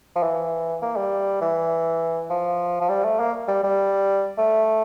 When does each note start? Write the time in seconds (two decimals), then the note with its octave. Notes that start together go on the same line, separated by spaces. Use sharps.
0.16 F3
0.23 E3
0.82 A#3
0.97 G3
1.41 E3
2.30 F3
2.81 F3
2.89 G3
3.04 A3
3.19 A#3
3.48 G3
3.63 G3
4.38 A3